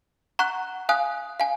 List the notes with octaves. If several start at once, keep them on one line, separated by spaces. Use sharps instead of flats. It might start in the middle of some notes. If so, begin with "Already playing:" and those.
F#5 A#5 C#6 F#6
F5 G#5 D#6 F#6
F5 G#5